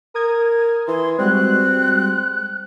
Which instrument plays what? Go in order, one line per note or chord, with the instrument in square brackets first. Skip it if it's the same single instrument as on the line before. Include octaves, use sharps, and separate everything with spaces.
[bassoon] A#4 [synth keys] D#6 G#6
[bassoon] E3 [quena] C6
[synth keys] G3 G#3 F#4 [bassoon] C4 [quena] F#6